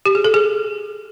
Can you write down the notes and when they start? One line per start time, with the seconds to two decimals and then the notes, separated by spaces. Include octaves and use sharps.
0.06 G4
0.15 G#4
0.24 A4
0.34 G#4